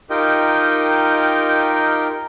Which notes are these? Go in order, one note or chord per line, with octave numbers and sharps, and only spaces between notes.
D#4 F4 G4 A#4 D#5 G5